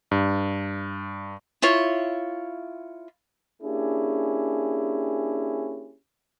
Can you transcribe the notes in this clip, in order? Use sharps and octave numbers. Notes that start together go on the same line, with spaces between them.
G2
E4 F4 C#5
A#3 C#4 D4 E4 G4 G#4